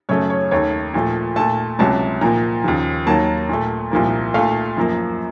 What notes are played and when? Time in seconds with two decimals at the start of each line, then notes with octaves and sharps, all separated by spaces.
0.09 F#2 C#3 F#3 A3 C#5
0.30 C#5
0.51 D#2 D#3 A3 C#5
0.94 A#2 F3 A3
1.36 A#2 A3 A5
1.79 C#2 C3 F#3 A5
2.21 A#2 F3 A#3 A#5
2.64 D#2 C#3 F3
3.06 D#2 D#3 F#3 A#3 A5
3.49 A#2 A3
3.91 C2 A#2 F3 A#3
4.34 A#2 A3 F5
4.77 F#2 F3 A#3